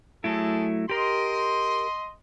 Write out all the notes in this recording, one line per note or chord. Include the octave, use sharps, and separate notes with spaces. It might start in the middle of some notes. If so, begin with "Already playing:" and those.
F#3 A3 E4 G#4 A4
G4 A#4 D#5 C6